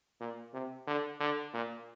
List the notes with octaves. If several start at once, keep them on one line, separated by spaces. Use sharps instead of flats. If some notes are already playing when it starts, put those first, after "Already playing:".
A#2
C3
D3
D3
A#2